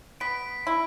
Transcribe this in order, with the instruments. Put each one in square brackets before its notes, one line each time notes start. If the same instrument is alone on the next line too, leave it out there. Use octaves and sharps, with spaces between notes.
[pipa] B3 [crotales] B6 D7
[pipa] E4